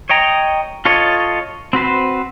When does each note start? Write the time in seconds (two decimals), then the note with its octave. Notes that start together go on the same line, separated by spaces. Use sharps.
0.09 C#5 D#5 G5 A#5
0.85 F4 A4 C#5 D#5
1.73 C4 F#4 B4 C5